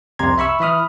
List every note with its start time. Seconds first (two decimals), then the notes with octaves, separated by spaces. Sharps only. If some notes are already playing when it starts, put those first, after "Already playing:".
0.19 C2 F2 C3 A#5 C6 G#6
0.38 E5 B5 C#6 E6
0.60 E3 E5 B5 D#6 F6